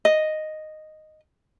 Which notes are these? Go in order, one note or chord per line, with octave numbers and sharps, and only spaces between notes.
D#5